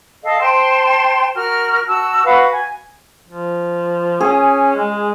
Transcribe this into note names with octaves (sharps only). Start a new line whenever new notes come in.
A4 D#5 F5
C5 G5 A5 C6
F#4 A#4 F6
F#4 A5 E6
F#4 B4 F5 F#5
G#5
F3
C#4 G#4
G#3